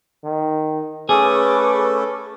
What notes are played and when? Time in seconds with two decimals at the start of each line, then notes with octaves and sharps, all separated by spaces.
0.24 D#3
1.09 A3 C#4 G#4 A4 B4 D6